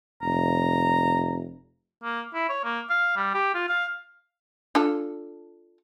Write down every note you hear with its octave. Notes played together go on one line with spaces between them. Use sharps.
F1 A#5
A#3
E4
C#5
A#3
F5
G3
G4
F4
F5
D4 F4 A4